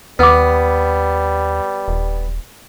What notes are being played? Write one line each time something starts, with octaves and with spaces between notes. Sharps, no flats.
D#2 G3 B3 B4 D6
D#1